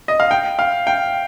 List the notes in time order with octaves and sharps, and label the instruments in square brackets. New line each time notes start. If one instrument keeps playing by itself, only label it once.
[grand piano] D#5
F5
G5
F5
G5